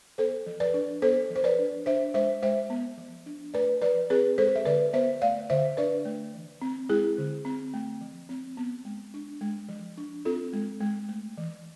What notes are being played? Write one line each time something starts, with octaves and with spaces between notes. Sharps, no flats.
B3 A4 C5
F3
B4 D5
D4
B3 A4 C5
F3
C5
B4 D5
D4
D4 C5 E5
G#3 C5 E5
G#3 C5 E5
B3
F3
D4
A3 B4 D5
F3 B4 D5
C4 G#4 B4
G#3 A4 C5
E5
D3 B4 D5
B3 C5 E5
A3 D5 F5
D3 C5 E5
D4 B4 D5
A3
E3
C4
G#3 E4 G#4
D3
C4
A3
F3
C4
B3
G#3
D4
G#3
F3
D4
C4 F4 A4
G#3
G#3
A3
E3